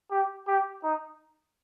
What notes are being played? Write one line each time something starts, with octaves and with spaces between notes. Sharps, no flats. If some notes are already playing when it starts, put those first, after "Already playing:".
G4
G4
D#4